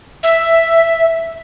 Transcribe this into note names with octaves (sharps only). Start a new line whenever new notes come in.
E5